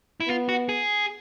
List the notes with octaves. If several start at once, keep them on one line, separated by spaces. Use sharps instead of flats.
E4
B3 F4
F#4
G#4